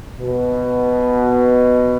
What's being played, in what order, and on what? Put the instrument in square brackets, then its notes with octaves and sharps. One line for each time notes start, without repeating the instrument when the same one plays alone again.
[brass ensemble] B2